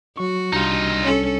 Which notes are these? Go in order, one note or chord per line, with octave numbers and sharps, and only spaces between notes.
F#3 F#4 C#6
C2 G3 D4 D#4 F4
C#4 A4